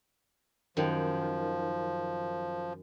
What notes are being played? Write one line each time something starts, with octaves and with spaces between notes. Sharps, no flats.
F#2 D#3 F3